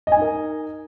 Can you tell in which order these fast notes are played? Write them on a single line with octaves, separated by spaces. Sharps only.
D#5 G#5 D#4 A#4